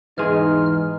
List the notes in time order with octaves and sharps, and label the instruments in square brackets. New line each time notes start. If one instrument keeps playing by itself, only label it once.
[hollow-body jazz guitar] E2 G#2 G#4 [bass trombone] D#4 [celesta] B4 C6 [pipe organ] F6